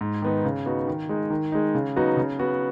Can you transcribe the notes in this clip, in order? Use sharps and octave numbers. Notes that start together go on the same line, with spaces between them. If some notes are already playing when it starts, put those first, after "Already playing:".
G#2
D#3 B3 D#4
C#3
B3 D#4 F#4
D#3
G#3 D#4
D#3
G#3 D#4
C#3
F#3 B3 D#4 F#4
C#3
B3 F#4